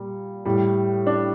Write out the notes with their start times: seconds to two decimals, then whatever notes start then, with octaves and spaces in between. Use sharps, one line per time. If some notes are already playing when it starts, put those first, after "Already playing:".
Already playing: A#2 G3
0.45 A2 G3
1.07 D4